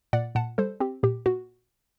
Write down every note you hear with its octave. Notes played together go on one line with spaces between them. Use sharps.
A#2 D5 F#5
A#2 F#5 A5
G3 A4 C5
C4 G4
A#2 G4
A#2 F#4